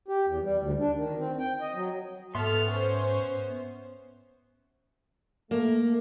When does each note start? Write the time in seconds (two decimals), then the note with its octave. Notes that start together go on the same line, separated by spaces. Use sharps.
0.08 G4
0.26 E2
0.43 G3
0.59 D2
0.79 D4
0.95 D#3
1.18 C4
1.39 G5
1.61 D#5
1.74 F#3
2.35 G#2 B3 A4 E5 C6 F6
2.67 C#4 C5
5.51 A3 A#3